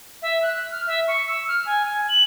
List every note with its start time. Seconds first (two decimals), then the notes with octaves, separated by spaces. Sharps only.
0.22 E5
0.42 F#6
0.71 F6
0.86 E5
1.07 C#6
1.27 E6
1.47 F6
1.65 G#5
1.84 G#5
2.08 F#7